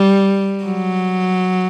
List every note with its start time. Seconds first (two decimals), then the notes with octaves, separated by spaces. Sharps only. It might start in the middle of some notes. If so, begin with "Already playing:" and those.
Already playing: G3
0.64 F#3